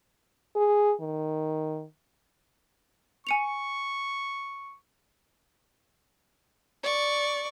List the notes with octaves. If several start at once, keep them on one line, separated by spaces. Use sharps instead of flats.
G#4
D#3
G#5 C#6 C#7 F7
D5 C#6